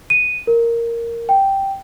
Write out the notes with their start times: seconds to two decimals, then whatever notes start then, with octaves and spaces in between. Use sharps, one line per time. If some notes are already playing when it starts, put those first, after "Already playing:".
0.10 D#7
0.47 A#4
1.29 G5